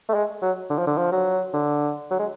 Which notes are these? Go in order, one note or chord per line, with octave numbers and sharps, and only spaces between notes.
A3
G#3
F#3
D3
F3
D3
F3
F#3
D3
F#3
G#3